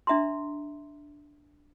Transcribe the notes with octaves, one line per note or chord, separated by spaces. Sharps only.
D4 E5 A#5 C6